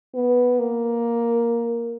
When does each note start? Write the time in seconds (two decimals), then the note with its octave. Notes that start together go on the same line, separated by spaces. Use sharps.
0.14 B3
0.59 A#3